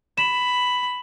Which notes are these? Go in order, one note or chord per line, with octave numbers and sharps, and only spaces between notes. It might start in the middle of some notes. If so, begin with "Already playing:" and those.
B5 E7